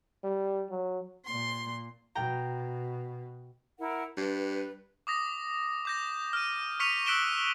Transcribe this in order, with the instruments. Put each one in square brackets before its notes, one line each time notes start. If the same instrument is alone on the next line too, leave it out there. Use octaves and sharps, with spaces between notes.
[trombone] G3
F#3
[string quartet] A#2 C6
[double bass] B2 [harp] G5 A#5
[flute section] E4 A#4 F#5
[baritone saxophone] G2 [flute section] B4
[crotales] D6 D#6 A#6
D6 G6 A#6
F6 D#7
C#6 F6 B6 C#7 D#7 F7
E6 F#6 B6 D7 E7 G7